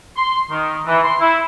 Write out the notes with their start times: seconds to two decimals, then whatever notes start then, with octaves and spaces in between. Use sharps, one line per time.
0.17 C6
0.50 D#3
0.87 E3
1.03 C6
1.20 E4